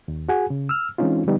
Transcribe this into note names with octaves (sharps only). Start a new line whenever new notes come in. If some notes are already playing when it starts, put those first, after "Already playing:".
D#2
F#4 G#4 F#5 G#5
C#3
E6 F6
E3 G#3 C4 C#4 D#4 F4
D3 F3 G3 B3 D#4